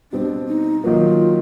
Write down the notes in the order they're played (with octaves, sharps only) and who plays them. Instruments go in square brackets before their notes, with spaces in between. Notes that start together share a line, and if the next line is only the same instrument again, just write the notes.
[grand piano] B2 G3 C4 [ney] D4
[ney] D#4
[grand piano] D#3 F#3 A#3 [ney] F4